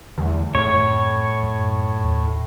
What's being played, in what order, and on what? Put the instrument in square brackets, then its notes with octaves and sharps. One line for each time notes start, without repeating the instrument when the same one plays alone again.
[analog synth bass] E2 [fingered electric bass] D3 G3 A3
[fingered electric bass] F#2 A3 C4 [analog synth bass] A2 [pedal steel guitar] C#5
[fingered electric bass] F#2
D#2